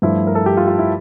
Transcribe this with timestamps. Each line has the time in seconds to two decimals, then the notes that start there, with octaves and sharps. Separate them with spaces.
0.02 G2 F3 A3 E4
0.27 A#4
0.35 A4
0.46 G4
0.57 F4
0.67 F4
0.78 E4